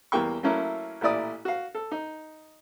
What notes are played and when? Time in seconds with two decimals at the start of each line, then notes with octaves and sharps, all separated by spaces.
0.12 E2 E3 G3 A#3 G5 C#6
0.43 F#3 A3 A#3 C#4 E4
1.01 A1 A#2 E4 D5 D#6
1.45 F#4 F5
1.75 A4
1.92 D#4